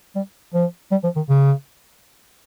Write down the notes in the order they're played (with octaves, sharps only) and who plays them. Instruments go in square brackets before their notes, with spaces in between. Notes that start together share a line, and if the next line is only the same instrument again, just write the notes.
[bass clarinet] G3
F3
G3
F3
D#3
C#3